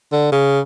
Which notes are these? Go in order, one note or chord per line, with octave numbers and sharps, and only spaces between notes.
D3
C#3